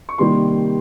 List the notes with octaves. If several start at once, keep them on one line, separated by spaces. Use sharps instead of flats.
C#6
C3 D#3 G3 A#3 C6